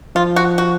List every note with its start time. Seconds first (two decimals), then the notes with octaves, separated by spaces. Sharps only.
0.16 F3 F4
0.36 F#4
0.58 F#4